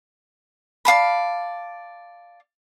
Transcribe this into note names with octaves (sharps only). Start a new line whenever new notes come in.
D5 F5 A5 B5